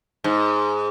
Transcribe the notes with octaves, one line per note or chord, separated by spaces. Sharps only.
G#2